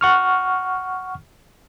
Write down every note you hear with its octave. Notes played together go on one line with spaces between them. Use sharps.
F#5 C#6 F6